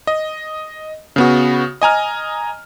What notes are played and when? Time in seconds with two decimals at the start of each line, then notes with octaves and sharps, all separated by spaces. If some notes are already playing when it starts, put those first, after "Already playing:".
0.07 D#5
1.16 C#3 B3 F#4
1.82 D#5 G#5 A#5 F6